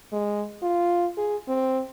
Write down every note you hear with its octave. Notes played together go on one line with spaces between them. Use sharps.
G#3
F4
G#4
C4